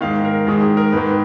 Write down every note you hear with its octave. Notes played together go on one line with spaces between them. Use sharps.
G#2 D#3 F5
A#4
G#2 D#3 G#4
G#4
A#4
G#2 D#3 B4